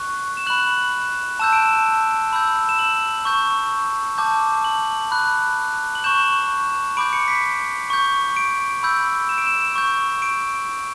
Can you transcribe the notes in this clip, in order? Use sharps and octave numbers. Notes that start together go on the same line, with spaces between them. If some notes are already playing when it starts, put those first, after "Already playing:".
Already playing: C#6 F#6
E7
B5 F#6 F#7
A5 E6 G6 E7
D7
E7
B5 E6 G6
E7
F#7
C#6 G6
A5 D6 G6
F#7
B5 F#6
F#7
C#6 G6 E7
B5 D6 G6 D7
C#7
B6
C#6 G6
D7
B5 E6 G6
E7
D7
E7
C#6 G6
D7